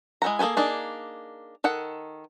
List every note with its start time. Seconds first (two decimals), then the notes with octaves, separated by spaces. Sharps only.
0.22 G#3 E4 A4 F#5 A#5
0.39 A#3 G#4 A4 B4 G#5
0.57 A#3 D4 D#4 G#4
1.64 D#3 A4 F#5